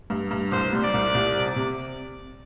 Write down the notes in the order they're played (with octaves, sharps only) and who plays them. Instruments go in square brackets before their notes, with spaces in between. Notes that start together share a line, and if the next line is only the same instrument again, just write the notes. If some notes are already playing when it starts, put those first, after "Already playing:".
[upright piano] G2
G2
[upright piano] C2 [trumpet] C5
[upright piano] G3
[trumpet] D5
[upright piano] C2
C2
C3
C3